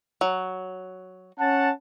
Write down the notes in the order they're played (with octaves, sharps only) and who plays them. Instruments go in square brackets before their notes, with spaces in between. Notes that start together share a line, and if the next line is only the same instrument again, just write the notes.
[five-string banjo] F#3
[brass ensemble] C#4 F#5 A5